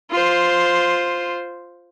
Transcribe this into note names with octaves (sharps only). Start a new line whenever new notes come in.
F4 C5